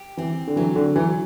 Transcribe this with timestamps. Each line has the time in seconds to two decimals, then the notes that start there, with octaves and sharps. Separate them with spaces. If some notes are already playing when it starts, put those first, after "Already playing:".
Already playing: G4
0.17 E3 C4
0.47 D3
0.56 E3 F#3
0.76 D3
0.96 E3 F#3